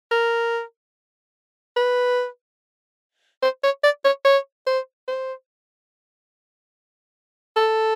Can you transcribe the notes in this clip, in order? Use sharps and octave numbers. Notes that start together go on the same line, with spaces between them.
A#4
B4
C5
C#5
D5
C#5
C#5
C5
C5
A4